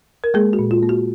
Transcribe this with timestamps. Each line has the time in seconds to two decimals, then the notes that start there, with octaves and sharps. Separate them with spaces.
0.24 A#4
0.34 G#3 A#3 G#4
0.53 F#4
0.59 A#2
0.71 F4
0.83 A#3
0.89 F#4